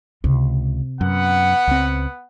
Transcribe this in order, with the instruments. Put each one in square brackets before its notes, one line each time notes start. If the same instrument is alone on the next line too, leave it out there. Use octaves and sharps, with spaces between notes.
[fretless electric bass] C#2 [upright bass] C3
[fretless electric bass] F#2 [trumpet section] B3 F#5
[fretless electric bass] C#2 C4